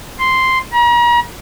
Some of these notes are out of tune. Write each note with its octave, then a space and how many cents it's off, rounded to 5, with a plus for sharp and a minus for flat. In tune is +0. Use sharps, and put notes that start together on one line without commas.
C6 -5
A#5 +40